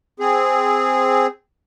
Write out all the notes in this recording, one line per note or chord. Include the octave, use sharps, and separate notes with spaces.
C4 G#4